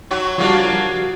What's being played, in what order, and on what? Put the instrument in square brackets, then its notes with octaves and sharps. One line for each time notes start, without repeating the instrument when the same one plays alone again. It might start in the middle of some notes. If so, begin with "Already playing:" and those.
[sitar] F#3 F#4
[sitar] C#3 A#3 D4 [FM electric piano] F3 G3 F#4